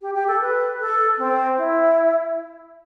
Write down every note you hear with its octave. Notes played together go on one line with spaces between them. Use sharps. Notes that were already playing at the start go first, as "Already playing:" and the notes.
G4
G4
A4
B4
A4
C4
E4